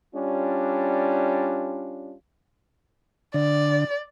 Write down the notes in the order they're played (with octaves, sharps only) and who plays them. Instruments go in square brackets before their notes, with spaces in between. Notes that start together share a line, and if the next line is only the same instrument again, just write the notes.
[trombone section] G3 C#4 D4 F4
[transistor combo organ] D3 [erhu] D5